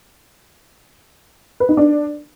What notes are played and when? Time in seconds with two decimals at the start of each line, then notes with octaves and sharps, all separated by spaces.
1.60 B4
1.69 D#4
1.77 D4